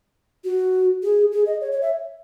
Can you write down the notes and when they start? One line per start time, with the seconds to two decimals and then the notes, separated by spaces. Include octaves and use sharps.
0.44 F#4
1.03 G#4
1.32 G#4
1.46 D#5
1.61 C#5
1.72 C#5
1.82 E5